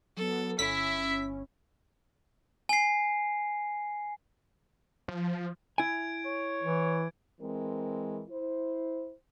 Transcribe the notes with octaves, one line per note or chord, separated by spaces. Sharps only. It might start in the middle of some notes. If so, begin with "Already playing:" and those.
F#3 B3 A4
G1 C#4 E4 E5 B6
G#5 C7
F3
E4 G#5 G#6 D7
C#5
E3
E3 G#3 C4 A#4
E4 C5